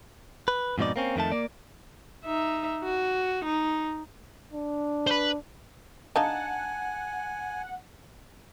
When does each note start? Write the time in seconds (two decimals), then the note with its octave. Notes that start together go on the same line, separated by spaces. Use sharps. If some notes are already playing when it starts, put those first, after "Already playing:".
0.48 B4
0.78 F2 G#2 B2 D#4 D5
0.96 A#3 C4 C#4
1.16 F2 D#3 A3 A5
1.32 A#3 D5
2.25 D#4 E5
2.83 F#4
3.45 D#4
4.53 D4
5.07 B4 C5
6.16 D4 D#4 F5 F#5 G#5 A5